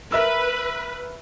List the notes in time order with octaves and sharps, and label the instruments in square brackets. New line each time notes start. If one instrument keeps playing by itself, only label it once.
[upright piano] A#4 E5 E6 [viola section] B4